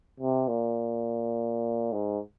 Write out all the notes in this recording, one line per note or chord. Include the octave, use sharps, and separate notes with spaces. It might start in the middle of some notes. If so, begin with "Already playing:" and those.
C3
A#2
G#2